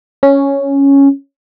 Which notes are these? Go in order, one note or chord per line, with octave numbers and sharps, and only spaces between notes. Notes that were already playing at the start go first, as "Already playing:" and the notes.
C#4